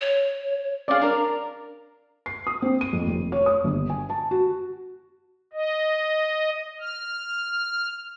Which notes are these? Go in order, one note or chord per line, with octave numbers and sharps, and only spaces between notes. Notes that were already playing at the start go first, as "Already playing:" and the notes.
C#5
C#4 D4 G#4 D5 F5
D4 A#4 A#5
C7
D#6
C4
D#7
F2
F1
C#5
D#6
G1
G#5
A5
F#4
D#5
F6